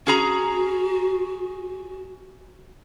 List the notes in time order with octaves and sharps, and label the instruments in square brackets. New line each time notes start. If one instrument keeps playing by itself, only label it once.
[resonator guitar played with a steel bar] C#4 G#4 A#5 [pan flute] F#4